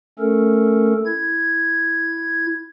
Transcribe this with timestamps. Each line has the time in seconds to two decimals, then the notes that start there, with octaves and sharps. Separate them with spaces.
0.19 A3 C#4 A4 A#4
1.06 E4 G#6